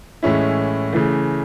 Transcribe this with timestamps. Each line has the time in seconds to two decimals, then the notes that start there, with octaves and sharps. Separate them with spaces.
0.23 A2 E3 G#3 C#4 E4
0.93 C#3 E3 A3